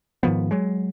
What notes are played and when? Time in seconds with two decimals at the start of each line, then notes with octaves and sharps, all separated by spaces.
0.23 G#2 D#3 F3 B3
0.51 F#3 G#3